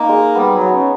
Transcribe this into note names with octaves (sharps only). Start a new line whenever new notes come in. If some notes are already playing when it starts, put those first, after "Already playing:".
Already playing: A#3 D#4
G#3
G3 B3
F#3
B3
C#3